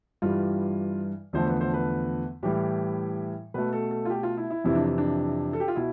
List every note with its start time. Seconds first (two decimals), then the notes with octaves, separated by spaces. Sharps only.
0.22 G2 E3 G3 F4
1.33 E2 D3 F3 A3 C5
1.46 B4
1.61 C5
1.74 B4
2.43 A2 E3 G3 G4
3.54 B2 A3 B4
3.73 A4
3.91 A4
4.05 F4
4.10 G4
4.23 F4
4.37 E4
4.50 E4
4.64 F2 C3 E3 E4
4.75 D4
4.98 D4
5.53 A4
5.60 G4
5.68 F4
5.75 B2 E4